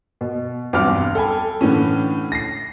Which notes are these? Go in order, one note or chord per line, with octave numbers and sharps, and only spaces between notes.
B2
B1 E2 G2 C4 D6 F6
A4 G5 G#5 B5
A2 D3 E3 C#4
A#6 C7